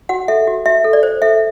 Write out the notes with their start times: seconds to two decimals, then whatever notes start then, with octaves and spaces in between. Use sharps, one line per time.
0.09 F#4 F#5
0.28 A4 E5
0.47 F#4
0.66 F#4 E5
0.84 A4
0.93 D5
1.03 C5
1.22 A4 E5